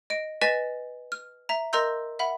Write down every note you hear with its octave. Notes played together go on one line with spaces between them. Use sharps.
D#5 D7
B4 D#5 G#5 A6 B6 E7
F6
E5 A#5
A#4 D#5 A#5 C6 E6 G6
E5 F#5 B5